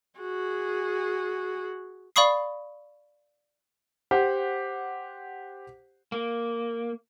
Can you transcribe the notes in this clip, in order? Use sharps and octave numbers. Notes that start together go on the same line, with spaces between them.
F#4 G#4
D5 F5 B5 C#6 D#6 C7
G4 C5 F#5
A#3